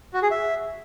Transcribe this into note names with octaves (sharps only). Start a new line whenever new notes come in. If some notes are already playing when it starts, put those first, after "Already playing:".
F#4
G#4
E5